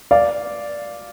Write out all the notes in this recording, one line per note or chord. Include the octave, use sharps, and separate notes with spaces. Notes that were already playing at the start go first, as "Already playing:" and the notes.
D5 F5